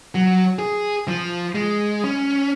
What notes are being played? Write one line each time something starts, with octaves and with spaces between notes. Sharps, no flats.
F#3
G#4
F3
G#3
C#4